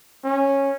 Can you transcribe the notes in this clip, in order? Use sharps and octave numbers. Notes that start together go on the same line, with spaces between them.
C#4